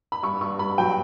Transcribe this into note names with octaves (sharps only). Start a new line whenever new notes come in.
B5
G2 C#6
G2 C#6
G2 B5
F#3 G5